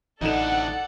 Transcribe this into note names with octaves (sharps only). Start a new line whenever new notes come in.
A1 D2 A2 D#4 A4 D5 F#5 E7